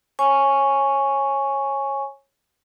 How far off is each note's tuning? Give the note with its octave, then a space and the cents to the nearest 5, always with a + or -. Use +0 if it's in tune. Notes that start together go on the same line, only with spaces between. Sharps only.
C#5 -20 G#5 +0 C#6 +0